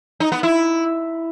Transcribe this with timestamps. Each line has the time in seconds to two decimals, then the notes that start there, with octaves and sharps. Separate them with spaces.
0.20 D#4
0.32 B3
0.43 E4